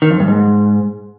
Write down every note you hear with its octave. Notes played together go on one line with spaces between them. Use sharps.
D#3
F2
G2
G#2